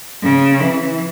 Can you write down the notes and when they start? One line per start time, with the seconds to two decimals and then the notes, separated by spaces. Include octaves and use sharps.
0.23 C#3
0.60 E3